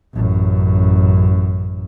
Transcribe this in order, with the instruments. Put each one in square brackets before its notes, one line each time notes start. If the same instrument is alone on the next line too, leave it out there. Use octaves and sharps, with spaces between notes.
[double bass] A1 F#2